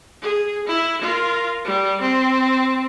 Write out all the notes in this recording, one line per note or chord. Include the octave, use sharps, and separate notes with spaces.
G#4
E4
F4 A#4
G3
C4